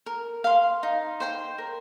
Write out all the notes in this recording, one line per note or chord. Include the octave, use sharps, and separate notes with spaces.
A#4
F5 C6
D#4
C5 G5 C6
A#4